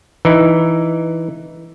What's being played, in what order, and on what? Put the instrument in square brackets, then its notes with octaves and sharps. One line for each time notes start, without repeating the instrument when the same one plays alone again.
[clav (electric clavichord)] E3 D#4